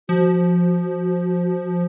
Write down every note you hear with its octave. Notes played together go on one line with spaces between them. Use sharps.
F3 F#4